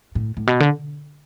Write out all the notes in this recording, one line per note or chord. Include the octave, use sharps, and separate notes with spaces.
A2
A2
B2
D3